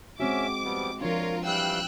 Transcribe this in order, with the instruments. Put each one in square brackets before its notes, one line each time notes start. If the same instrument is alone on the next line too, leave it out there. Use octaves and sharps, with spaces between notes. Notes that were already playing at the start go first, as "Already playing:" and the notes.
[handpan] G#3 C4 F#4 [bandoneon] C#4 E5 [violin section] D6
[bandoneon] F3 G3 B3
[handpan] F3 D4 [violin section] F4 A#4 [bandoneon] C#5
[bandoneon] E3 G3 F5 [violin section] G5 E6 F#6